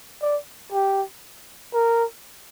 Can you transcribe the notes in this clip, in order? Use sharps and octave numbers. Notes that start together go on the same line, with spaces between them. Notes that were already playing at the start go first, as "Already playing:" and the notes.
D5
G4
A#4